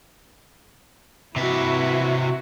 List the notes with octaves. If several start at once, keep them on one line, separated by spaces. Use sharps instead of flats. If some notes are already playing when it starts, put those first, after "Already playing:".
C3 E4 F#4 B4